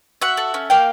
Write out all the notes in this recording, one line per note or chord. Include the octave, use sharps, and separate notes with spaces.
F#4 E5 F#5
A4
C#4
A#3 F5 G5